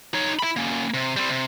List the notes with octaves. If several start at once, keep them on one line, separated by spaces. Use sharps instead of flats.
D#4 C#5
E4 B5
A#3 C#4
C3
G3 C4
C3